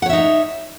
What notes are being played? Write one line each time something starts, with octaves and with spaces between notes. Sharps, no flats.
D#4 C#5 E5 F#5